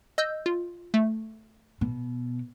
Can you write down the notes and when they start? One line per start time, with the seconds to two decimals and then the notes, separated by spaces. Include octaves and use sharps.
0.18 D#5 E6 G6
0.46 F4
0.94 A3
1.81 B2